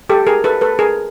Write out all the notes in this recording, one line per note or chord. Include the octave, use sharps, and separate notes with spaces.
G4 A4
G#4 A#4
A4 B4
A4 B4
G#4 A#4